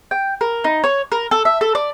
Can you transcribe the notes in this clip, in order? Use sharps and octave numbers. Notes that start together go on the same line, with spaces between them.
G5
A#4
D#4
C#5
A#4
A4
E5
A4
D5